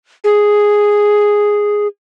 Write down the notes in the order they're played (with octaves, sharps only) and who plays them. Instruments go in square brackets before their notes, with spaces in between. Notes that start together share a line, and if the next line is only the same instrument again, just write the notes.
[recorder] G#4